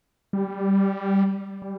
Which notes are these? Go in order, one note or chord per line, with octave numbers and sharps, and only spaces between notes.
G3
G3